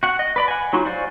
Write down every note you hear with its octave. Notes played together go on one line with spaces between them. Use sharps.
F#4 F#5
D#5
B4 D5 B5
F#5 G#5
F#3 D#4 F4 F#4
F#4 C5 D5 F5 G#5